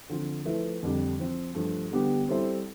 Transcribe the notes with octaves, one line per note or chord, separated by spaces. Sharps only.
D3 F3 C4 F4
F3 A3 E4 B4
F2 D3 G3 D4
F3 C4 F4
G2 F3 A3
D3 G3 B3 D4 G4
G3 C4 E4 A4 C5